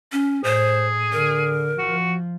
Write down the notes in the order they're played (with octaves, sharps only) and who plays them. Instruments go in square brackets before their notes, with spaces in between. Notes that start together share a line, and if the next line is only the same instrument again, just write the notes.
[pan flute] C#4
[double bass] A2 [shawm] G#4 [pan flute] C5
[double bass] D3 [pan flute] A#4
[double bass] F3 [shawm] F#4